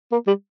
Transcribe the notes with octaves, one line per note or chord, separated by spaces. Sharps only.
A#3
G3